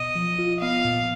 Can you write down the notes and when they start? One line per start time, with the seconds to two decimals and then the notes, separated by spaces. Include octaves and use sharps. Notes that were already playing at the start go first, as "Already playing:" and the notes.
Already playing: B2 D#5
0.15 F3
0.38 F4
0.62 B3 F5
0.85 A#2